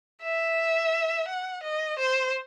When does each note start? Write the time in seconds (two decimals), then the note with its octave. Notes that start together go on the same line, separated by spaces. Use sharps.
0.22 E5
1.28 F#5
1.64 D#5
1.99 C5